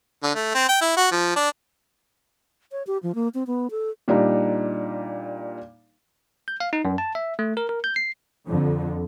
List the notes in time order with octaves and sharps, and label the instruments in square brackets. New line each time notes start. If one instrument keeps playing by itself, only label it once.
[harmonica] D3
A3
C4
G5
E4
F#4
F3
D4
[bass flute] C#5
G4
F3
A#3
C4
B3
A4
[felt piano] A#2 G3 D4 D#4
[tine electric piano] G6
F5
D#4
F#2
A5
E5
A3
A#4
A#4
G6
C7
[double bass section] F2 D3